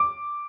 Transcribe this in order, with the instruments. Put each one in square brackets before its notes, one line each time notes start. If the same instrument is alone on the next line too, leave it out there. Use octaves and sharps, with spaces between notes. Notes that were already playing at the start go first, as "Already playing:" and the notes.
Already playing: [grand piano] D6